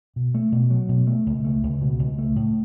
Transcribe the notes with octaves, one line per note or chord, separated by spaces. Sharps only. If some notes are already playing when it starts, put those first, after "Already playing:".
B2
A3
B2
F#3
B2
A3
C#2
A3
C#2
B2
C#2
A3
A2